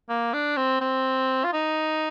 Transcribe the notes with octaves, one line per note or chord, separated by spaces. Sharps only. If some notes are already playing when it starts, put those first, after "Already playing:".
A#3
D4
C4
C4
F4
D#4